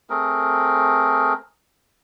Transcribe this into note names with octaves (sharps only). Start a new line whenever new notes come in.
A3 C4 G#4 A#4